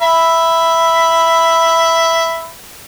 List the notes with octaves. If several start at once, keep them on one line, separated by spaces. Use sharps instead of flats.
E5 B5